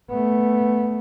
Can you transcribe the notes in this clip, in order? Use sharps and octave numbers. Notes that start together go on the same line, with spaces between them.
A3 B3